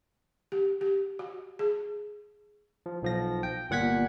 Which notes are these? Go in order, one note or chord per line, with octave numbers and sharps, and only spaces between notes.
G4
G4
F#4
G#4
F3
B1 F3 A#6
G5
G1 A#2 F#5 G#6 B6